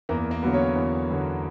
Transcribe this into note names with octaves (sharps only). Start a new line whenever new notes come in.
E2 A#3 A#4
A#3 A#4
D3 F#3 B3
C#4 C#5
E2
D3 F#3 B3